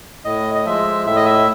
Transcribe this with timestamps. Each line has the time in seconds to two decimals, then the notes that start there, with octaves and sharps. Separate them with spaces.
0.25 A2 D#5
0.54 D#5
0.65 F3 G#3 E5
1.06 A2 E5
1.16 D#5
1.26 E5